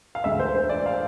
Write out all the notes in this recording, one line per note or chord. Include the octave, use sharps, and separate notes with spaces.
F5
E1 D2 D3 E5
C5
C5
D5
F5